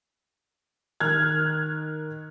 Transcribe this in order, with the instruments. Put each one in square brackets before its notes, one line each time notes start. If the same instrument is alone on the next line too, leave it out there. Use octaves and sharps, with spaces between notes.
[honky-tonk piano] D#3 F6 F#6 G#6